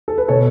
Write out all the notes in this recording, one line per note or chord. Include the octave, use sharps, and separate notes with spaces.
A4
B4
B2 A4 C#5